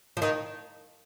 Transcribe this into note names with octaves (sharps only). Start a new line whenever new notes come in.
F3
D#3